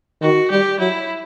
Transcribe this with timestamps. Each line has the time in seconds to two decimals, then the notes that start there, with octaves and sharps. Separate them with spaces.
0.22 D#3 F#4
0.51 G3 G4
0.79 F#3 E4